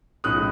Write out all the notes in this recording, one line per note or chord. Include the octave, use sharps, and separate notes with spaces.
B1 A2 G#3 C#4 D#6 F#6